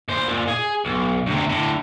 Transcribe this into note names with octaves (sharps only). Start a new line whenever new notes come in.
A#2 C5
A#2
G#4
B1
D2 C3
A2 D3